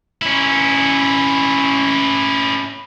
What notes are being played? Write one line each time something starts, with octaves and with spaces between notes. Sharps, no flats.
C#4 E4